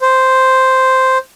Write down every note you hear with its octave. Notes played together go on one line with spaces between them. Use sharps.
C5